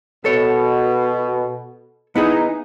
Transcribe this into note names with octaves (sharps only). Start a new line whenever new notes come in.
B2 A4 C#5
B3 D#4 E4 G#4